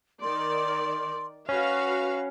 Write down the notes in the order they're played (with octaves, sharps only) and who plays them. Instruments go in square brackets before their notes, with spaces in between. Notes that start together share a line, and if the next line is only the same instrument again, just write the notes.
[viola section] D#3 D5 [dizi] C6
[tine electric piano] C#4 [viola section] F#4 B4 F5 [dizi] C#6